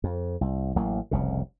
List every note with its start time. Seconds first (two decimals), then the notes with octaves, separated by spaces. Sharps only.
0.04 F2
0.41 C2
0.76 A1 F#3 A#3
1.11 F1 C2 C#3